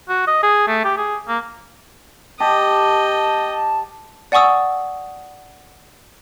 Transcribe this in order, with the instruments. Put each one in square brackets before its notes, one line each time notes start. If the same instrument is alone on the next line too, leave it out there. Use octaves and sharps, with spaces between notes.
[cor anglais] F#4
D#5
G#4
A3
G4
G#4
A#3
[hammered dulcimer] G4 [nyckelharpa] D#5 G5 [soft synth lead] A5
[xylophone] D5 F#5 G#5 C#6 D#6 E6